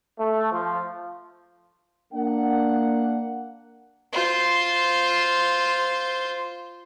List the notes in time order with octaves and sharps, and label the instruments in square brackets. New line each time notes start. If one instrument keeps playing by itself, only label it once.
[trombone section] A3
F3
[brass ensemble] A#3 D4 F#5
[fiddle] F4 C5